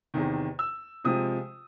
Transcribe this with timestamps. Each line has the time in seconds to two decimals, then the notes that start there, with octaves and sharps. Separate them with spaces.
0.14 E2 C3 D#3
0.59 E6
1.04 C3 F3 G#3 D#6